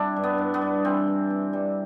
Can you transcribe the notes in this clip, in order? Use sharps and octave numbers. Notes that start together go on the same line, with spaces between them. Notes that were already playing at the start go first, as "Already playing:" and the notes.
Already playing: C3 G3 D4 E4
G2
B3
G2
B3
G2
E3 C4
E3
C3
G3